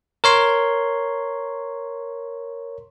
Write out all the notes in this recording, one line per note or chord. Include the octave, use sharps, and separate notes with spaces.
A#4 C#5 C6